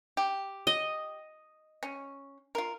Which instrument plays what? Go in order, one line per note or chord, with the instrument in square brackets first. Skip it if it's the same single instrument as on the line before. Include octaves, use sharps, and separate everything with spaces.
[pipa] G4
[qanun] D#5
[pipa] C#4
F4 A#4